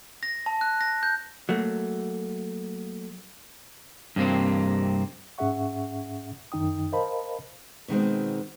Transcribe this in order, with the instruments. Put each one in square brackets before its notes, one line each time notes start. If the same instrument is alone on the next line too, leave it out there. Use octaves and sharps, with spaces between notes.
[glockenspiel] A#6
A5
F#6
A#6
G6
[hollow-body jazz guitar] F#3 A3 A#3
[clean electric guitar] G2 C3 A#3 C4
[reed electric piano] G#2 C#4 G#4 E5 F#5 C#6
F#2 D#3 D#4 G5 D#6
A#4 C5 D#5 F5 A5 B5
[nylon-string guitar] B2 D#3 G#3 C4